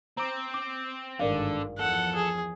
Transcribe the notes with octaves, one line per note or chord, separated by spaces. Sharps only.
C4 A#5 D6
D6
G#1 G2 D3 A#4 D5 F5
E2 F3 A4 F#5
G#4